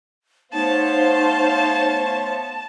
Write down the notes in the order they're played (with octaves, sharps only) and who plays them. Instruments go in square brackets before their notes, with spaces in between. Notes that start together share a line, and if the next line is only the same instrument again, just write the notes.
[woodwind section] A3 B3 C#5 [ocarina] D#4 [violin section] C5 F5 C6 [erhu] A5